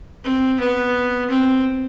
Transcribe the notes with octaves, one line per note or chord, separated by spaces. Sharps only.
C4
B3
C4